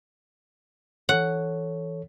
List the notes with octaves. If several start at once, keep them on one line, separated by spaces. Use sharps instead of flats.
E3 A4 C#5 F#5